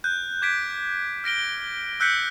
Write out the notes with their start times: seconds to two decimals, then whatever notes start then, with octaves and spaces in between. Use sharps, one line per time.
0.04 F#6 G6
0.42 D6 G#6 B6 D7
1.24 F6 A#6 D7 G7
2.00 E6 F#6 G6 B6 C#7